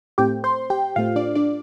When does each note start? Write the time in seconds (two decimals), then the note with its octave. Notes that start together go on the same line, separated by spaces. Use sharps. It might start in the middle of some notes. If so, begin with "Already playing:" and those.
0.18 A2 A3 C4 G4 G5
0.44 C5 C6
0.70 G4 G5
0.96 A2 A3 C4 F4 F5
1.16 D4 D5
1.35 D4 D5